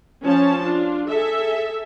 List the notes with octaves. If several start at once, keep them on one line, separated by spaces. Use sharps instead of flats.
F3 C#4 C#5 A5
D4 F4
G#4 A4 E5